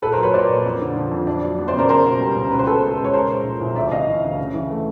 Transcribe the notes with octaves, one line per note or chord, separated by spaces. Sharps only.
A#2 A4 B4
A#4 C5
F#3
B4 C#5
A#3 C5 D5
A#2
F2
D3
F3
F2
D4
F#3
B3
C5 D5
C#3
A#4 C5
A#3 A#4 C5
B2
G3
C#2
C#2 B4
C5
B2 A4 B4
G#3
C#2
C#5
G#3 A#4 C5
A#2
F3
C2
D2 D5 E5
C3 D#5 F5
E3
D2
C#3
E3
A3